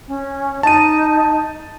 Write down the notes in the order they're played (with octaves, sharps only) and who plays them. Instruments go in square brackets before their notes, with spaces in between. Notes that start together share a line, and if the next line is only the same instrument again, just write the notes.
[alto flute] C#4
[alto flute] D#4 [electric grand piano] A5 D#7